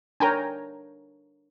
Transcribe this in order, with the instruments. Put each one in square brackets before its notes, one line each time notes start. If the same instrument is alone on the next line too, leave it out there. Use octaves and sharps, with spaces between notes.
[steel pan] D4 A#4 C#5 [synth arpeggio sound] G5 G#5 A#5